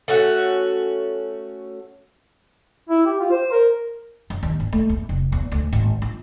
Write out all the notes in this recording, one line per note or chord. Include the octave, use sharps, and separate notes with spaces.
A3 C#4 F#4
E4
G4
F4
C5
A#4
F#2
D#2
G#1
A3
E2
F1
E2
D2
G#1
F4